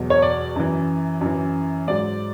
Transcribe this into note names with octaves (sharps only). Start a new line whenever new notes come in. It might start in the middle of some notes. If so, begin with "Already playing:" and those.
Already playing: E2 B2 F#3
C#5
D5
F#2 E3
F#2 E3
G#2 F#3 D5